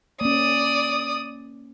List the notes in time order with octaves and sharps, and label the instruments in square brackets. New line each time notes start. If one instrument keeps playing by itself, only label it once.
[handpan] A#3 C#4 [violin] D5 D#6